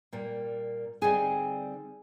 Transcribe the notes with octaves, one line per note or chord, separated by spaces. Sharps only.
A#2 G3 A#3
D3 G3 C4 D#4 G#4 G#5